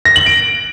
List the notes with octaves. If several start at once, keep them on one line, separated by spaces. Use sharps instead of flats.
A#6
F#7
D7